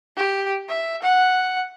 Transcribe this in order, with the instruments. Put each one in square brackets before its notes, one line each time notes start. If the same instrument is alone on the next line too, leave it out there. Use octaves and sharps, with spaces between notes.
[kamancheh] G4
E5
F#5